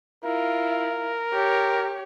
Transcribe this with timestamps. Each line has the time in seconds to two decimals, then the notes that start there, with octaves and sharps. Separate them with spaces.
0.25 E4 F4 A#4
1.33 G4 C#5